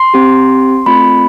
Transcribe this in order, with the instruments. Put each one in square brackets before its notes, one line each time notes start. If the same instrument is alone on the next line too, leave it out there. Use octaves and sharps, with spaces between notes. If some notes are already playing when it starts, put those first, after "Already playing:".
Already playing: [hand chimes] C6
C4 G4
A3 C4 F4 B5